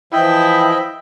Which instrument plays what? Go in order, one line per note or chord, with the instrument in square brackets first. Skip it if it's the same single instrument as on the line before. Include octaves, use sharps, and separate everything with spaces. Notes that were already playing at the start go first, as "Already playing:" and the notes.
[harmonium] E3 F3 [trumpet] E4 [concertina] D#5 E5 B5 [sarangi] G5